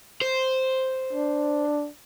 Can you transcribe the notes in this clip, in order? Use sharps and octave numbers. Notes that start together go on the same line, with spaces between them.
C5
D4